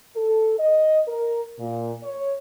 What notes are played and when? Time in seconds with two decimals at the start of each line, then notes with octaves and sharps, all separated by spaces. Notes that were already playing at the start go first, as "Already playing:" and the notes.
0.16 A4
0.59 D#5
1.08 A#4
1.59 A#2
2.03 C#5